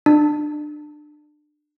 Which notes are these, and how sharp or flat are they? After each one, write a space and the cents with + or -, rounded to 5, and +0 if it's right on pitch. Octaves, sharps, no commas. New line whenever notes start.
D4 +30